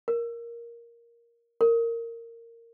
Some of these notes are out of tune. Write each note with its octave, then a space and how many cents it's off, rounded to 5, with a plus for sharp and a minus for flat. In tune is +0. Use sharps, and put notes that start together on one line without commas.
A#4 +5
A#4 -15